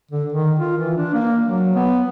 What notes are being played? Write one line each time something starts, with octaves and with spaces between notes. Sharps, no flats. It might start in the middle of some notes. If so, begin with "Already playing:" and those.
D3
D#3
F4
E3
D4
A#3
F#3
B3